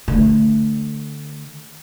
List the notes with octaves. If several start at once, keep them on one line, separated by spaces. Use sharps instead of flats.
D3 A3